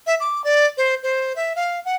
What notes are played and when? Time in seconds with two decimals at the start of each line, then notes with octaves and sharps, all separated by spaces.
0.07 E5
0.20 D6
0.44 D5
0.77 C5
1.03 C5
1.36 E5
1.56 F5
1.85 F#5